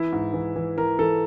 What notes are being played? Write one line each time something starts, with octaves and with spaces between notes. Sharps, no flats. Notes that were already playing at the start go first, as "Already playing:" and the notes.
Already playing: E3 E4
G#2
E3
E3
E3 A#4
E3 A4